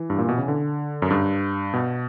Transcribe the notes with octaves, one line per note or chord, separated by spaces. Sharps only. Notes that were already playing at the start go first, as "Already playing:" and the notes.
Already playing: E3
G2
A#2
B2
C#3
D3
F#2
G2
B2